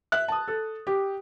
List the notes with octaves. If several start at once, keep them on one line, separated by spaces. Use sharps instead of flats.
E5 F#6
A5 D#6
A4
G4